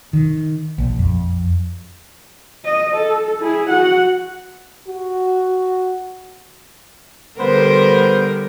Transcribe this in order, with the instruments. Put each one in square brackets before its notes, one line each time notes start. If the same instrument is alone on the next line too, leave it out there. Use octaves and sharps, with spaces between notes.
[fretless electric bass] D#3
A#1
F2
[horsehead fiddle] D#5
A4
E4 G#4
F#4 F#5
[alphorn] F#4
[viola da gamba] D3 G3 A#4 [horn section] B3 C5